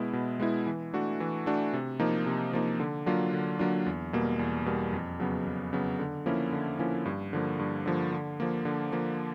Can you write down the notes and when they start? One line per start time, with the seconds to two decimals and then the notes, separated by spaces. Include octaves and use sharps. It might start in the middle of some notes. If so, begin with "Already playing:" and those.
Already playing: B2 G#3 B3 E4
0.13 B2
0.40 G#3 B3 E4
0.66 E3
0.94 A3 D4 F#4
1.20 E3
1.46 A3 D4 F#4
1.73 C3
2.00 F3 A#3 D#4
2.26 C3
2.53 F3 A#3 D#4
2.80 D3
3.06 F#3 A#3 D4 F4
3.33 D3
3.59 F#3 A#3 D4 F4
3.86 E2
4.13 B2 G3 A#3
4.39 E2
4.66 B2 G3 A#3
4.93 F2
5.20 C#3 F#3 B3
5.46 F2
5.73 C#3 F#3 B3
5.99 D3
6.26 F3 A#3 C#4 E4
6.53 D3
6.79 F3 A#3 C#4 E4
7.06 G2
7.33 D3 F3 A#3
7.59 G2
7.86 D3 F3 A#3
8.12 D3
8.40 F3 A#3
8.65 D3
8.92 F3 A#3